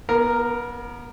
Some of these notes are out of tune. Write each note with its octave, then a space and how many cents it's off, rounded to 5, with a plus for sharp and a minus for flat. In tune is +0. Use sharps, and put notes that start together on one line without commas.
B3 -35 A#4 +0